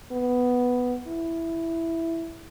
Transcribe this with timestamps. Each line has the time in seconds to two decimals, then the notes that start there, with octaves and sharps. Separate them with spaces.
0.12 B3
1.07 E4